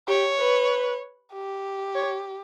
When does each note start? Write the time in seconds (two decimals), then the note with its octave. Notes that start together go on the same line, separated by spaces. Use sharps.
0.08 G4 C#5
0.40 B4
1.33 G4
1.95 C#5